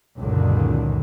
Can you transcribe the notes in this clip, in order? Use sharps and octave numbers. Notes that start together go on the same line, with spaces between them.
C#2 F#2 A#2 D3 D#3